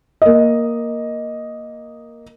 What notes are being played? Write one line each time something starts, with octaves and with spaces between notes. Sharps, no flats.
A#3 D#5